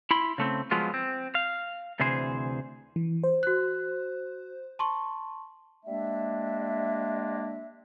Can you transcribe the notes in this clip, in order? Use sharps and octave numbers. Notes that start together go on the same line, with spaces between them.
E4 B5 C6
C#3 A3 C4
F3 F#3 G#3 B3 F4
C4
F5
D2 C3 E3 G#4 C5
E3
C5
F#4 F#6
A5 C6 C#6
G3 G#3 A#3 D4 E5